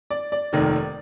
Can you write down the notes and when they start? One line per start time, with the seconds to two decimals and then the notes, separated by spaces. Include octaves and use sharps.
0.10 D5
0.32 D5
0.53 F1 D#2 D#3